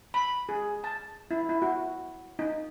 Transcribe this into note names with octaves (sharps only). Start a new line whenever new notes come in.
B5
G#4
A5
E4
E4
F#4
D#4